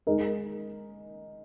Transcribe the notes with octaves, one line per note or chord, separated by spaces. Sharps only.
G#3 D#4 A#4